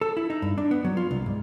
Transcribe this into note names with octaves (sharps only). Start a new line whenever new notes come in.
A4
E4
D#4
G2
D4
B3
F#3
F4
C2
G#2